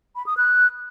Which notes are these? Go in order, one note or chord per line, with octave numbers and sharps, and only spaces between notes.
B5
D#6
F#6